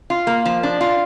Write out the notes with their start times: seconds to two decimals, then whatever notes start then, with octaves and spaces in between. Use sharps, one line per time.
0.10 F4
0.27 A#3
0.45 F3
0.63 D4
0.81 F4